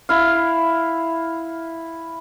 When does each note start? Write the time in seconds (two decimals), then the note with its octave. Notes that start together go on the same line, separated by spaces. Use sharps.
0.09 E4 F5